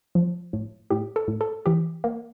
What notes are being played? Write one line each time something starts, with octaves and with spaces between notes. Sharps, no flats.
F3
A2
A2 G4
A4
A2
A4
E3 G4
A#3